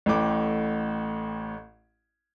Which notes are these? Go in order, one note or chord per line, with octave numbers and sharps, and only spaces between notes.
A1 A2 G5 D6